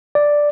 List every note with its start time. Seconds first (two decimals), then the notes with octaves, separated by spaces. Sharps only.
0.15 D5